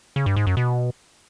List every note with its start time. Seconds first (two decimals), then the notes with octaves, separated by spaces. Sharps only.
0.16 C#3
0.26 G2
0.36 G#2
0.47 F#2
0.57 B2